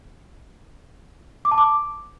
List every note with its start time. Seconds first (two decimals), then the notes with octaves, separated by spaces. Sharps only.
1.45 D6
1.51 A5
1.58 D6